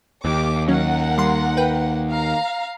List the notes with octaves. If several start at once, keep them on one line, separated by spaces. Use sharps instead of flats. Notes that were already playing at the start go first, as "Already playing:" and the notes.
D#2 G4 D6
F#3 C#4 A#4 F#5
G3 C6
B4 G5
F5 A#5